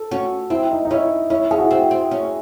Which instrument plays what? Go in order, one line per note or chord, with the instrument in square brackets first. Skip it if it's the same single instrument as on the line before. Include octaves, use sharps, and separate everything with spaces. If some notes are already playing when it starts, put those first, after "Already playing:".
Already playing: [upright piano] A4
[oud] C#4 [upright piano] F#4
[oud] C4 [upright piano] E4
[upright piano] D#4
D#4
[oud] C#4 [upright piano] E4
[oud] C#4 [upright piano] E4
[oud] C#4 [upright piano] G#4
[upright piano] F#4
E4
[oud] C4 [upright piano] F#4
[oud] C4
C#4